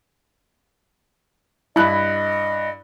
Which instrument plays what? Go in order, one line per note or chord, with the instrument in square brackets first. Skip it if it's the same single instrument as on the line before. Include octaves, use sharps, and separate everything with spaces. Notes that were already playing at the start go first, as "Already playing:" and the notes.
[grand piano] G2 F#6 [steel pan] E4 [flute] D#5